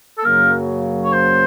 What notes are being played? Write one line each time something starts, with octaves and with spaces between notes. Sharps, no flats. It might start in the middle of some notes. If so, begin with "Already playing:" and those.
A4
F#2 C#3 F#3 A#3 A#4
C#5
C5